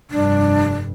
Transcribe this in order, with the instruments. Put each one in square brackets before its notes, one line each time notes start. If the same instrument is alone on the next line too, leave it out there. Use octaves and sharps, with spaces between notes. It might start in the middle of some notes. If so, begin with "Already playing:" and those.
[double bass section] F1 G2 [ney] D4